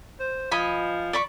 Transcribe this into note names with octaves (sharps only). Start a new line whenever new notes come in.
C5
F3 D#5 G#5 B5
D5 B5 C#6